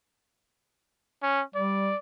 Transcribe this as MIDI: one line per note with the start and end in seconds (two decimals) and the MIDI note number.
1.22 1.42 61
1.55 1.91 55
1.55 1.97 74